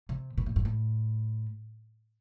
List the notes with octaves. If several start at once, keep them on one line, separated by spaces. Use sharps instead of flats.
C3
B2
A2
G2
A2